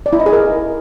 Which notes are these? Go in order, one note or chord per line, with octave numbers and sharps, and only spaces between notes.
D5
E4
D#5
G#4
A#4